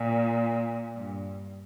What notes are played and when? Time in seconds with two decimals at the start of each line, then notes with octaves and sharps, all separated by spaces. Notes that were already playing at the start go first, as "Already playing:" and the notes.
Already playing: A#2
0.96 G2